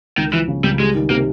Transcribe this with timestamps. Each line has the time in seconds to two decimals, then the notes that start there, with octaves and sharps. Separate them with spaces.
0.18 C#2 D#3
0.33 E3 F3
0.48 C#3
0.64 C#2 G3
0.80 G3 G#3
0.95 D#3
1.10 C3 A#3